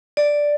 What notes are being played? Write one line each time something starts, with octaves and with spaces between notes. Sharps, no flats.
D5